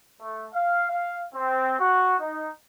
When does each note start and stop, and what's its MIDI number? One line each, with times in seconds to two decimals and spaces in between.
0.21 0.47 57
0.55 0.87 77
0.91 1.23 77
1.35 1.76 60
1.80 2.15 66
2.20 2.49 63